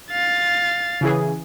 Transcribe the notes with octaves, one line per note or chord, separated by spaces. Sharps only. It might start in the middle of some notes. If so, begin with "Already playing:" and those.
F5 A6
C#3 E3 G#4